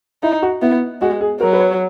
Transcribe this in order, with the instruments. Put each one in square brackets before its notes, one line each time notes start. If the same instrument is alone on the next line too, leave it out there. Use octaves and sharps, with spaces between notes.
[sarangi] D#4 [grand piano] E4
[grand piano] F#4
[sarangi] B3 [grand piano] E4
[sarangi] G#3 [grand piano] F#4
[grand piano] G#4
[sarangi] F#3 [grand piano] A#4
[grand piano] B4
C#5